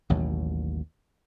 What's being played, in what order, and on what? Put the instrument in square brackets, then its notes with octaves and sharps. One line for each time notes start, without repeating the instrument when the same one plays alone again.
[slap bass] A1 D#2 B2 F#3